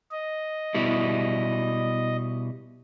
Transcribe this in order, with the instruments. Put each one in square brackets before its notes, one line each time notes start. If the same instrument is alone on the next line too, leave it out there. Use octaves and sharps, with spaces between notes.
[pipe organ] D#5
[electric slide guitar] B2 G3 E4